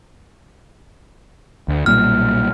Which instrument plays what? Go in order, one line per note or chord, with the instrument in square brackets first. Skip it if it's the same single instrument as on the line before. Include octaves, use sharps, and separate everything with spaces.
[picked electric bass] D2
[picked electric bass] B1 A#2 G3 [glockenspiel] F6